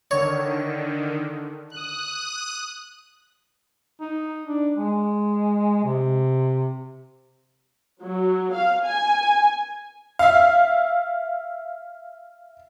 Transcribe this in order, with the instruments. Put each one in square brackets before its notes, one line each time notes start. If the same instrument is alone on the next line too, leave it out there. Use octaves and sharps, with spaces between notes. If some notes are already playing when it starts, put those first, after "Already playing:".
[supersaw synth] D3 D#3 [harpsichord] C#5
[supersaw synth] D#6 F#6
[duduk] D#4
D4
G#3
C3
[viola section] F#3
F5
G#5
[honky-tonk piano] E5 F5